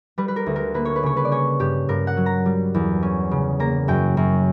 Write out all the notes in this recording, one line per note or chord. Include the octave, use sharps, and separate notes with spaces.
G3 B4
B4
A#4
D2
A#4
A#3 B4
C#5
B4
C#3 C#5
B4
D5
C#4 C#5
G2 G4
G2 A#4
F#5
F#3
A#5
G3
E2
C#4
C#3
A#3 A#5
F#2 G5
F#2